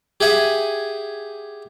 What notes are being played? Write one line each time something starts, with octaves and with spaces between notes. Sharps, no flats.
G4 G#4 E5 F#5 G#5